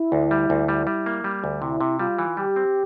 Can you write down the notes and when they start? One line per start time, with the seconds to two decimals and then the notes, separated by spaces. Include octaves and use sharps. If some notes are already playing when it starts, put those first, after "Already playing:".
Already playing: E4
0.12 D2
0.31 G3
0.50 D2
0.68 G3
0.87 G3
1.06 A#3
1.24 G3
1.44 D2
1.62 C3 E4
1.81 C3
1.99 G3 F4
2.19 E3
2.37 G3 G4
2.56 C4